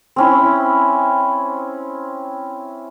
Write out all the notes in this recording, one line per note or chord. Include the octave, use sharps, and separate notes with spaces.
C4 C#4 E4